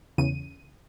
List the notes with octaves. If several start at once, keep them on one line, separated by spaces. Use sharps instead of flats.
E2 C#3 D#7